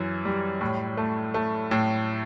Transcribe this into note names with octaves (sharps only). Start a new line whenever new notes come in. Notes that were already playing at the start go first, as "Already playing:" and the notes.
Already playing: F#2 E3
G3
A2
A3
A3
A2